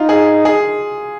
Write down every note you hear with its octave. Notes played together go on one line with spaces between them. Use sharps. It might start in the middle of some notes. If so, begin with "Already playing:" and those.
Already playing: D#4 F4
G#4
G#4